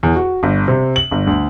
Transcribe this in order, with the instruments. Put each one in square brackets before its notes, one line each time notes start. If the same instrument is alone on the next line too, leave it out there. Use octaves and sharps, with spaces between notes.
[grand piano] E2
F#4
G1
C3
F#7
G1
D2